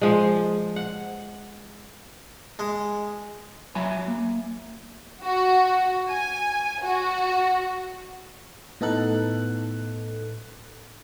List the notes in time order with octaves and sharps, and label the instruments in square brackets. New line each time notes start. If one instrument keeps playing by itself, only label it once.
[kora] F3 G#3
F#5
[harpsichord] G#3
[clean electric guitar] F#3 E5 G#5 B5
A#3
[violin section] F#4
G#5
F#4
[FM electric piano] A2 B3 D#4 A4 F#6